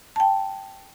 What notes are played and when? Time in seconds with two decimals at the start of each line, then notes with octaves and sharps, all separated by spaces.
0.16 G5 A5